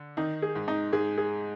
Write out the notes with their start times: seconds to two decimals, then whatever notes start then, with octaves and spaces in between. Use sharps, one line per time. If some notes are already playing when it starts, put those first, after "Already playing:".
Already playing: D3
0.17 D#3 D#4
0.42 G#4
0.56 G#2
0.68 D#4
0.93 G#2 G#4
1.18 G#4